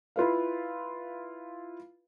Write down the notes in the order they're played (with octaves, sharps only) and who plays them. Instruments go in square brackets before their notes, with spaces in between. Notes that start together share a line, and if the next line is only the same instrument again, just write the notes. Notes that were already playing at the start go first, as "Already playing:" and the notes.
[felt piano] E4 F4 B4 F5